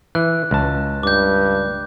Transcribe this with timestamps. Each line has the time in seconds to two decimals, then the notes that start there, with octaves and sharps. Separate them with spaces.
0.15 E3 F#6
0.51 C#2 A5
1.03 G2 D6 G6